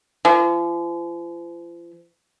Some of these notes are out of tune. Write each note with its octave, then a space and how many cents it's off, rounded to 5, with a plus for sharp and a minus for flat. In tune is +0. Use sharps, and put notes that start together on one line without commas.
F3 -40